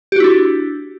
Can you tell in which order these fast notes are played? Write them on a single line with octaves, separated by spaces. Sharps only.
G4 F#4 E4 D4